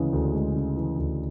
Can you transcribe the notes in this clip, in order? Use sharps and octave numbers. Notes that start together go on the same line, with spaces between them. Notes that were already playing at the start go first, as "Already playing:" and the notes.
Already playing: D2 C#3 E3 G#3
D2
G#3
C#3
E3
D2